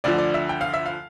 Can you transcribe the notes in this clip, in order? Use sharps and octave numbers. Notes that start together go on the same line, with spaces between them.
D2 D3 F3 D5
D5
E5
G5
F5
E5
F5